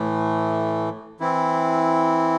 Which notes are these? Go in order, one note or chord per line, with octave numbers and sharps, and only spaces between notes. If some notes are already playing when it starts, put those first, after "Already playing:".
Already playing: A2 E3 A3
E3 C4 E4